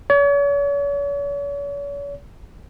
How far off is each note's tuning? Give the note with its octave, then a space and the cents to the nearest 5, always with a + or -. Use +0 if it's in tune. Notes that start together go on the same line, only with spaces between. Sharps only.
C#5 +40